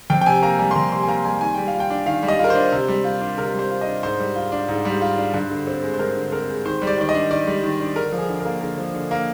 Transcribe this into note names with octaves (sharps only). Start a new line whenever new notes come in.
F2 G5
G5
C3 G#5
A#3 A#5
G3 G#5
C6
F2 A#5
C3 C6
G#5
A#3 A#5
G3 G#5
D#3 G#5
G3 G5
F5
F4
G5
D4
D#3 F5
G3
D#5
F4
A#4
D4 C5
C3
G3
F4
D4
C3 A#4
G3 C5
F4
D#5
D4
G#2 C5
G3
F4
D4
G#2
G3
F4
D4
G2
D3
C4
G#3
C5
G2 A#4
D3
C4 A#4
G#3
D#3 C5
G3
D5
D#3 D5
D#5
D4
D#3 D5
G3
D#3
D4
D3 A#4
F3
G#4
D3
A#4
A#3
D3 A#4
F3
D3
A#3